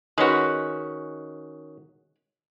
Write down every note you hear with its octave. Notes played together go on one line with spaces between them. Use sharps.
D#3 G#3 C#4 F#4 B4